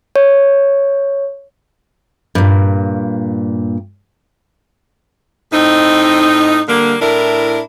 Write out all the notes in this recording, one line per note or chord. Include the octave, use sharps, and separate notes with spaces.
C#5
G2 A#2
A2 C4 D#4
D3 G3 A#3
A2 D4 E4 A#4